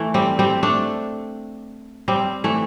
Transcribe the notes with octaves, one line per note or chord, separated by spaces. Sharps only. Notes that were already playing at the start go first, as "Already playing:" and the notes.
Already playing: E3 A3
G3 C4
G3 C4
A3 D4
G3 C4
E3 A3